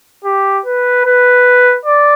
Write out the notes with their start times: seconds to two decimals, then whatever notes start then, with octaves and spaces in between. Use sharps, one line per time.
0.25 G4
0.66 B4
1.05 B4
1.86 D5